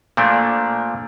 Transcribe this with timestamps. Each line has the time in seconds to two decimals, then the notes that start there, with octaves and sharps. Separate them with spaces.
0.17 A#2 F3 A3 A#3 D4